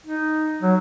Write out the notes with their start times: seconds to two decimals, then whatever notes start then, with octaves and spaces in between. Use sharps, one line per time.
0.07 D#4
0.62 F#3